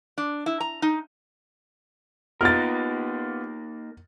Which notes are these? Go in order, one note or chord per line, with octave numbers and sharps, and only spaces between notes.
D4
E4
A#5
D#4
A#3 B3 D#4 F4 A#4 F6 A6